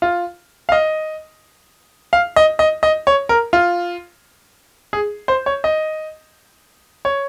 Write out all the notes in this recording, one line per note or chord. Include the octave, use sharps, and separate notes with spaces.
F4
F5
D#5
F5
D#5
D#5
D#5
C#5
A#4
F4
G#4
C5
C#5
D#5
C#5